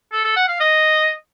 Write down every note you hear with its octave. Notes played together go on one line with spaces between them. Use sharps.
A4
A4
F#5
F5
D#5